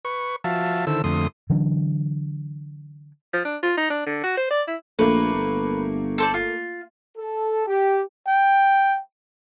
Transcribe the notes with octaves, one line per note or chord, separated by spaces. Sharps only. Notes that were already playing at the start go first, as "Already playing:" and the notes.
B4 C#6
F3 F#4 E5 F5 A5
D3 D#3 E4 A4 C5 E6
F2 D3 A3 C6 D#6
D3 E3 F#3 D4
F3
D4
F4
D#4
D4
D3
F#4
C5
D5
E4
A#1 A3 A#3 B4
G1
A4 C5 D5
F4
A4
G4
G5